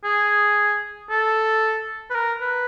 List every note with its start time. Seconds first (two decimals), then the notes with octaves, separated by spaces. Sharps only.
0.04 G#4
1.10 A4
2.10 B4
2.14 A#4
2.41 B4